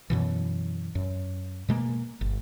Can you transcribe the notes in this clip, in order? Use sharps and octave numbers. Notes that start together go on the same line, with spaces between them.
F#2 B2 E3
F#2
B2 G#3 A#3
G1